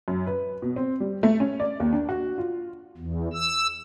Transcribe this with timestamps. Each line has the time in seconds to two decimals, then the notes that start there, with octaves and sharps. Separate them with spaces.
0.08 F#2
0.27 B4
0.62 B2
0.76 C4
1.00 G3
1.23 A3
1.40 C#4
1.60 D5
1.80 D#2
1.93 D4
2.09 F#4
2.38 F4
2.97 E2
3.33 E6